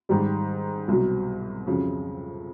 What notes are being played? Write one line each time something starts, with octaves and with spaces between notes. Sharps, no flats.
G#2 D#3 G3
C2 B2 F#3
F2 C#3 F#3